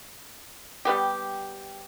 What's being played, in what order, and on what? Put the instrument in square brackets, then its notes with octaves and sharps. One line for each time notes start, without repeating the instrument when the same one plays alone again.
[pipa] G3 B3 G4